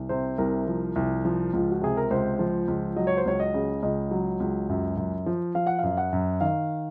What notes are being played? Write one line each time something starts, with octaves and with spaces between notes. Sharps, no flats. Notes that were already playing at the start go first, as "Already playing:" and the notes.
Already playing: C2
C3 C5
C2 A#4
F3
C2
F3
C#2 F4
F#4
C3 G#4
A#4
C#2 C5
F3
C#2
F#3 D#5
C#5
C5
C#2 C#5
D#5
C#3
C#2 D#5
F#3
C#2
F#2
F#2
F3
F3 F5
F#5
F#2 F5
F#5
F#2
D#3 F5